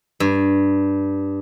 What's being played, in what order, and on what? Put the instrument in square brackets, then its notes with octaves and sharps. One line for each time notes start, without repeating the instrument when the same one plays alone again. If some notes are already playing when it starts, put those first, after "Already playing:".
[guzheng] G2